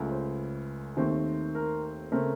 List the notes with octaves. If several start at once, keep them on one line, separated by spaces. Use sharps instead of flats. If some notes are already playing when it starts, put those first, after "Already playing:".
Already playing: C#2 C#3 A3
C5
D#2 D#3 A3 C4
A#4
C#3 A3 C4 A#4